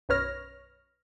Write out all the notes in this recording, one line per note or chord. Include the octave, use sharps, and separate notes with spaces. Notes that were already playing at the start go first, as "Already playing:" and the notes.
B1 F#2 B4 C#5 F6 A#6